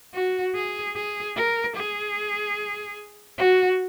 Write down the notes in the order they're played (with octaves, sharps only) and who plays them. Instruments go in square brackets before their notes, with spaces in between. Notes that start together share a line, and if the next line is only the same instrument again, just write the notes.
[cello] F#4
G#4
G#4
A#4
G#4
F#4